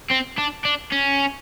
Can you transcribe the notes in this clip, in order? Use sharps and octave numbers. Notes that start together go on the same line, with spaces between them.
C4
D4
D4
C#4